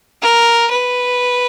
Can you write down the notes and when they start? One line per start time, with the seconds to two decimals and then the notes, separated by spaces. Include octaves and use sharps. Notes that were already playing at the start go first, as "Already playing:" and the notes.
0.22 A#4
0.71 B4